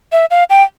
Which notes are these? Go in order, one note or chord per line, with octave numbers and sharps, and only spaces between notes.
E5
F5
G5